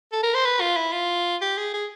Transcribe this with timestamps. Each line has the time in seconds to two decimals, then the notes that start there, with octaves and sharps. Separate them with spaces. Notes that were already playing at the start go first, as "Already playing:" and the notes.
0.12 A4
0.23 A#4
0.34 C5
0.46 B4
0.61 F4
0.77 E4
0.93 F4
1.42 G4
1.57 G#4
1.74 G#4